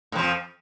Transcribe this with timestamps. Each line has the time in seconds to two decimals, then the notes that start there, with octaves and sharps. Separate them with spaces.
0.12 A2
0.15 F3
0.18 F2